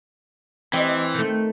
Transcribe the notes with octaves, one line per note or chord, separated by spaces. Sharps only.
E3 C4 G4 D#5
D#3 A3